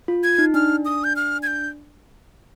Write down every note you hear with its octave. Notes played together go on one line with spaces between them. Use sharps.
F4
G#6
D#4
D4 F6
D#6
G6
F6
G#6
G6